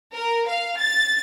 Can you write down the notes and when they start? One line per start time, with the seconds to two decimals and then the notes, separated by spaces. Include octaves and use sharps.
0.13 A#4
0.48 F5
0.79 A6